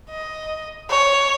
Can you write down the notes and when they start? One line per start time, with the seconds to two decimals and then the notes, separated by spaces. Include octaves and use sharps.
0.10 D#5
0.90 C#5